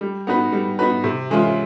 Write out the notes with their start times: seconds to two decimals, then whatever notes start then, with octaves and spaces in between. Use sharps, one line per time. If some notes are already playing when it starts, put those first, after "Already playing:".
0.01 G3
0.27 B3 D#4 F#4 B4
0.52 G3
0.79 B3 D#4 F#4 B4
1.04 C3
1.30 E3 G#3 C#4 F4